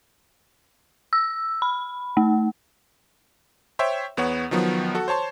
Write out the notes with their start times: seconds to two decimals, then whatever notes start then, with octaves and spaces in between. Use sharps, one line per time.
1.13 E6
1.62 B5
2.17 A3
3.79 C5 C#5 E5 G5
4.17 E2 B3 C#5 F#5
4.51 D#3 F3 F#3 B3
4.95 F#4 A4
5.08 C5 C#5 A5 C6